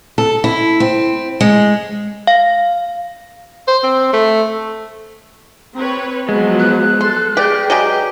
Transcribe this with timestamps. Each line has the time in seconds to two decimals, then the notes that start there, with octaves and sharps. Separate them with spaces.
0.18 A4
0.44 E4
0.80 C4
1.41 G#3
2.27 F5
3.68 C5
3.84 C4
4.13 A3
5.76 C4 B4 C#5
6.29 F3 F#3 G#3 B3
6.60 F#6
7.01 A4 C6
7.37 G4 G#4 B4 D5 G5
7.70 F#3 G#3 G4